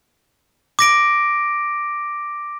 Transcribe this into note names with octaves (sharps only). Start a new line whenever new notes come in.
D6 A#6 D7